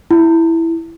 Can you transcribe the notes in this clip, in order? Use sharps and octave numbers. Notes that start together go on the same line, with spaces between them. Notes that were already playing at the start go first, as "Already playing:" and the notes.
E4